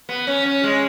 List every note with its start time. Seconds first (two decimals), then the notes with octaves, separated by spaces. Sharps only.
0.09 B3
0.27 C#4
0.46 C#4
0.64 G#3